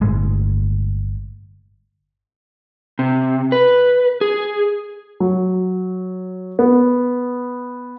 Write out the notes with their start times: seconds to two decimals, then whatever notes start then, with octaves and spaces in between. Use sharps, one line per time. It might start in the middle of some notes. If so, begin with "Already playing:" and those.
0.01 G1 A2 G#3
2.99 C3
3.52 B4
4.21 G#4
5.20 F#3
6.59 B3